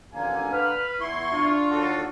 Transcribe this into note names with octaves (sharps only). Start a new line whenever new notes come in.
A1 F2 D3 A#3 G#5
B4 F6
E2 E4 C6 C#6
D4 F4
D#2 F#4 A4